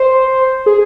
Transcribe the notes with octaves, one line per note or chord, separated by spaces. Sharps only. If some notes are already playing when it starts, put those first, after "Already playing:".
Already playing: C5
G#4